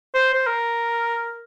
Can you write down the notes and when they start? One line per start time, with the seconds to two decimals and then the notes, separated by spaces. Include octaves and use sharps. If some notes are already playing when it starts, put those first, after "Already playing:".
0.14 C5
0.33 C5
0.46 A#4